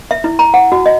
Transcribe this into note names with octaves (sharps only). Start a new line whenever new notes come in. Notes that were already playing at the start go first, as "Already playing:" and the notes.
E5
E4
A#5
F#5
F#4
D#5